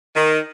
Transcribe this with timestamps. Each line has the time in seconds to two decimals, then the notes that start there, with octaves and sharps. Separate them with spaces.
0.16 D#3